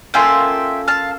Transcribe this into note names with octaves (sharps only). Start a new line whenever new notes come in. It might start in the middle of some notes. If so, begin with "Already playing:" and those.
A#3 C#4 F4 A4 E5 G5
F5 A5